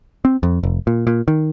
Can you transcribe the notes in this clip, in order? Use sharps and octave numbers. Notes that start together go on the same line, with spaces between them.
C4
F2
F1
A#2
A#2
D#3